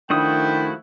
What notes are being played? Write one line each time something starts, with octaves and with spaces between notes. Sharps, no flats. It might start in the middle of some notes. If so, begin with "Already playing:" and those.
D#3 F3 A3 D4 E4 F#4 G5 D#6